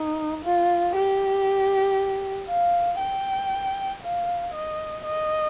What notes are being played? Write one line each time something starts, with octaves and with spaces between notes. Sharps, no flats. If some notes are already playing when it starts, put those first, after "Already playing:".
Already playing: D#4
F4
G4
F5
G5
F5
D#5
D#5